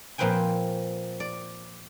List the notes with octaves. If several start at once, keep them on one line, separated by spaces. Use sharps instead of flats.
A#2 F3 C4 B4 G5 G#5
D5